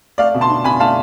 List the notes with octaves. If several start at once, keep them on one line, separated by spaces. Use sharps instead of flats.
A3 D5 F5
B2
A5 C6
D4
B2 G#5 B5
A3 F5 A5